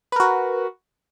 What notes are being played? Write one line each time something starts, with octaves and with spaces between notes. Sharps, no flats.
F#4 A#4 B4